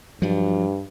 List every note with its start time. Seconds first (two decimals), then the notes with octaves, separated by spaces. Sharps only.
0.22 G2 F3 F#3